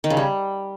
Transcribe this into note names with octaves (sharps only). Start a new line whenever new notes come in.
D#3
C#3
G3